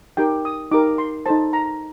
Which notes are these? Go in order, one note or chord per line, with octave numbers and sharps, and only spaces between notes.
D#4 G4 A#4 G5
D#6
D#4 G4 A#4 D6
C6
D#4 A4 C5 A5
A#5